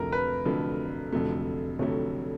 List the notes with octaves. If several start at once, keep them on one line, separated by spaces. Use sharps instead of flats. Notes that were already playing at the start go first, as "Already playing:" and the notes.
Already playing: F1 F2 D3 F#3 A3 A#4
B4
F1 F2 D3 F#3 A3
F1 F2 D3 F#3 A3
F1 F2 D3 F#3 A3 C#5